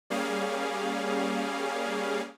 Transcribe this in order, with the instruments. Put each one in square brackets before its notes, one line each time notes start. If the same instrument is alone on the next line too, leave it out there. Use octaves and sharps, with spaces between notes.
[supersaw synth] G3 A#3 C#4 G#4 F5